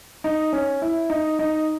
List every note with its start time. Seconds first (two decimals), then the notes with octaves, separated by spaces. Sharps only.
0.24 D#4
0.53 C#4
0.82 E4
1.10 D#4
1.39 D#4